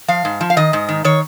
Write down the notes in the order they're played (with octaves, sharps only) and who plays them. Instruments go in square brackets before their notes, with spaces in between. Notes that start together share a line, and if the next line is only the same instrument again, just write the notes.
[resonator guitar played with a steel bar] F3 F5
G#2
F3
F5
D#3 D#5
G#2
D#3
D#3 C#5